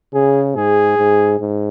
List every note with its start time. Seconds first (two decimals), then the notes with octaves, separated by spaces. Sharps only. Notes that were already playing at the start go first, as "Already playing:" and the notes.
0.13 C#3 G#4
0.56 G#2 G#4
0.98 G#2
1.40 G#2